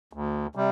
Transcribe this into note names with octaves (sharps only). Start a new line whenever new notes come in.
D2
C3 G3